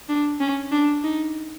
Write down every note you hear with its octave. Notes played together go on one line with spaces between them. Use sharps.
D4
C#4
D4
D#4